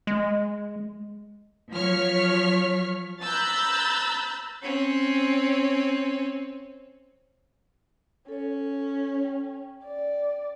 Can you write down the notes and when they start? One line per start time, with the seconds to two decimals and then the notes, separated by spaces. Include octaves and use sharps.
0.07 G#3
1.75 F3 F#3 C#5 C#6 F6 B6
3.23 A#5 B5 E6 F#6 G6 A6
4.63 C4 C#4
8.28 C#4 A4 C#5
9.24 G5
9.84 D5